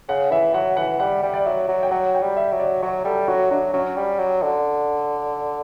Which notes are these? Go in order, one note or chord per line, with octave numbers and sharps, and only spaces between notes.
C#3 F#5
E3 E5
F#3 F#5
E3 F#5
G3 F#5
G3
D5
F#3 E5
F#3
G5
F#3 F#5
G5
G3
E5
F#3
D5
F#3 C#5
G3 A4
F#3 F#4
F#3 D4
F#3 C#4
G3
F#3
D3